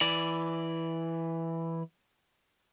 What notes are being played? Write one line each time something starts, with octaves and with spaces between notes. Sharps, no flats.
E3 D5